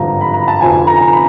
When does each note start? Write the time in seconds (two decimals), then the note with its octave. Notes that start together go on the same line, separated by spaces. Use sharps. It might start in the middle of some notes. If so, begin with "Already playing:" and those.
Already playing: G#1 G2 D3 F3 A#5
0.21 B5
0.34 A#5
0.48 A5
0.61 F1 F2 D3 F3 G#5
0.87 A#5
1.13 B5